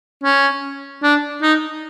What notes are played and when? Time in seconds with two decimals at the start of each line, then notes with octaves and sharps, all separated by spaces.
0.24 C#4
1.03 D4
1.42 D#4